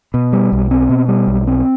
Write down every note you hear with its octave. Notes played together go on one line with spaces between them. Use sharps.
B2
G3
B1
C4
B2
G3
B1
C4